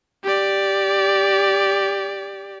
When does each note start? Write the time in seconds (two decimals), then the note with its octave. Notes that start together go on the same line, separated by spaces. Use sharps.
0.24 G4 D5